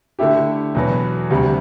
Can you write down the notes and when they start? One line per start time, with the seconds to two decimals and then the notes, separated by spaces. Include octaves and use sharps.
0.19 D3 A3 E4 G4
0.75 E2 B2 F#3 B3
1.30 D2 C3 G3